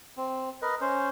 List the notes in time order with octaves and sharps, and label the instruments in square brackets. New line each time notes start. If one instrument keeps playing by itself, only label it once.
[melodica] C4
A#4 B4 D#5
C#4 C5